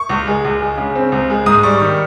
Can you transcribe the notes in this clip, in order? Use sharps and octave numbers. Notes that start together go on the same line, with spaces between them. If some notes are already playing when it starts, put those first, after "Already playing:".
Already playing: C#6
C#2
G#3
C#2
G#3
C#3
C4
C#2
G#3
G#2 D#6
G3 C#6
D#3 C#6